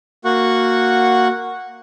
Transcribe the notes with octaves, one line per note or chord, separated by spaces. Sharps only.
A#3 F#4 F#5 C#6